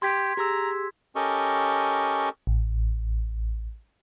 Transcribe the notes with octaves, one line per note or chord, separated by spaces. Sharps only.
G4 C6 G#6 B6
G4 G#4 A#5 E6
C#4 G4 A4 A#4 D#5 C#6
A1